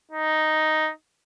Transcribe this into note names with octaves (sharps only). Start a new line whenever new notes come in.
D#4